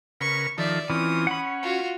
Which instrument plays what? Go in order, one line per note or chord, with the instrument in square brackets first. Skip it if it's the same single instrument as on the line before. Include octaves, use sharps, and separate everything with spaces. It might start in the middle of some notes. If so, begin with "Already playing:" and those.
[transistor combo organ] C#3 A#4 B4 [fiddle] C#6
[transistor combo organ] D#3 F3 A4 [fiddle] D5 E5
[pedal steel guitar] E3 [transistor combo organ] C4 C#4 F4 [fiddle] D#6
[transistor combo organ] C#4 [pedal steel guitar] F#5 B5
[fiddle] F4 F#4